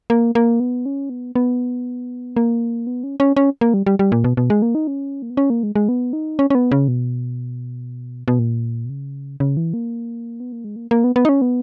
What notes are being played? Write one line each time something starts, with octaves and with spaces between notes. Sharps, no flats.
A#3
A#3
B3
C#4
B3
B3
A#3
B3
C#4
C#4
C#4
A#3
G3
G3
G3
A#2
B2
B2
G#3
A#3
D#4
C#4
A#3
B3
C#4
A#3
G#3
G#3
B3
D#4
C#4
C#4
B3
C#3
B2
B2
A#2
B2
C#3
C#3
E3
A#3
B3
A#3
G#3
A#3
A#3
B3
B3
D#4
C#4
B3